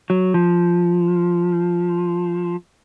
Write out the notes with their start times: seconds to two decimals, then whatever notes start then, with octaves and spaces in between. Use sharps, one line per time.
0.10 F#3
0.34 F3